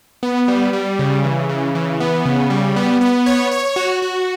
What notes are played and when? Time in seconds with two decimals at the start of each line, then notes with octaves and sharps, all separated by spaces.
0.23 B3
0.48 G3
0.73 G3
0.99 C#3
1.24 E3
1.49 C#3
1.75 E3
2.00 B3
2.25 C#3
2.50 G3
2.76 B3
3.01 B3
3.26 C#5
3.51 C#5
3.76 F#4
4.02 F#4